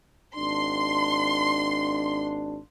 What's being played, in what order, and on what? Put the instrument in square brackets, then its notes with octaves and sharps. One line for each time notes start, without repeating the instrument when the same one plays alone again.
[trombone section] G#1 D4 [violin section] C6